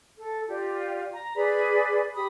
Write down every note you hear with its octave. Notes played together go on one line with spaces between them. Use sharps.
A4
F4 G4 D5 G5
A#5
G#4 B4 D5 B5
G4 B5 D#6